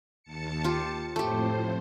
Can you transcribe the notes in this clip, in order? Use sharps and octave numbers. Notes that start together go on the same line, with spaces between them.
D#2 A5 C#7
F4 G4
F2 A2 A3 G4 C5